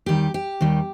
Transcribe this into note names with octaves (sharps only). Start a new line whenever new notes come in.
D#2 D#3 G3 G4
G4
D#2 D#3 G3